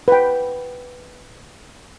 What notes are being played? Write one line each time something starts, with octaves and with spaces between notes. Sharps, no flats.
B4 G5